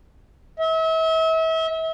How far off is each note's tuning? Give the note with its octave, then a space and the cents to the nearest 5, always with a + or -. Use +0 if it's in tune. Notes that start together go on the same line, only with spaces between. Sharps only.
E5 -35